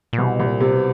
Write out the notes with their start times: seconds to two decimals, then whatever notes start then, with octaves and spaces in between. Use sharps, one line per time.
0.13 A#2
0.18 C2 B2
0.40 C2
0.46 A#2
0.61 C3
0.75 B2